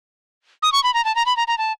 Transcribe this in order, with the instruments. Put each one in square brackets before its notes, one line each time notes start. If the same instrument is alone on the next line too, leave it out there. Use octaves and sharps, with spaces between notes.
[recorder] D#6
C#6
B5
A#5
A5
A#5
B5
A#5
A#5
A5